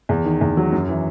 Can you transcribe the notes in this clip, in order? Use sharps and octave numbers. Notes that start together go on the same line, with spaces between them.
E2
D#3
E2
F#3
F#2
E3